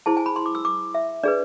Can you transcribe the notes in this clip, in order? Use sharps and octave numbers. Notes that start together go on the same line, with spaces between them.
E4 G#4 C5 A5
G#5
B5
C6
D6
E6
D6
E5
D4 G#4 B4 D5